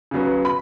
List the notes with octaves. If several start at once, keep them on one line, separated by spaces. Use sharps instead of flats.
C#3 F#3 B3
B5